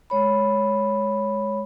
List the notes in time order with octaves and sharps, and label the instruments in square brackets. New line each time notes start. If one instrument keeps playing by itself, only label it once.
[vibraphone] G#3 C#5 B5